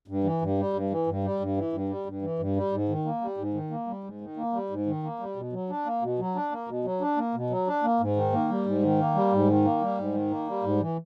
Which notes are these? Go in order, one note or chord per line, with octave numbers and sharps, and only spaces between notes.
G2
E3
G2
G3
G2
E3
G2
G3
G2
E3
G2
G3
G2
E3
G2
G3
G#2
D#3
A#3
G3
G#2
D#3
A#3
G3
G#2
D#3
A#3
G3
G#2
D#3
A#3
G3
B2
F#3
D4
A#3
B2
F#3
D4
A#3
B2
F#3
D4
A#3
B2
F#3
D4
A#3
G#2
D#3
A#3
G3
G#2
D#3
A#3
G3
G#2
D#3
A#3
G3
G#2
D#3
A#3
G3
G#2
E3